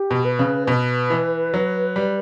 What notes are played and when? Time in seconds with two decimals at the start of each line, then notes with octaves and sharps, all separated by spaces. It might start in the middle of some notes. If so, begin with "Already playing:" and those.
Already playing: G4
0.11 B2
0.25 B4
0.39 C#3
0.67 B2 B4
1.10 E3
1.54 F#3
1.96 G3